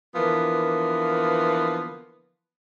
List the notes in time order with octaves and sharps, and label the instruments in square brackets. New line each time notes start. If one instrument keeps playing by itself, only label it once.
[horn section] D3 E3 F3 A#3 B3